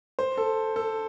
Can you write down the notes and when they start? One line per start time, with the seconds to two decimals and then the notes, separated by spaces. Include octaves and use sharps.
0.19 C5
0.38 A4
0.76 A4